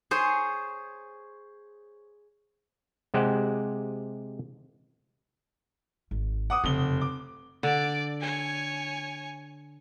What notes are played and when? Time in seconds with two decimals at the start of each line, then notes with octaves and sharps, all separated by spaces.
0.11 G#4 C5 C#5
3.14 C3 G#3 G4 C5 F#5
6.11 G#1
6.50 F#5 D6 D#6
6.64 F1 F#2 C#3 G7
7.02 D6
7.63 D3 D5 D7
8.21 C#5 G#5